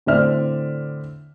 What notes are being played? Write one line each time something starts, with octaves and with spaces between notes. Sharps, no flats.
A2 D3 C4 D5 E5 F6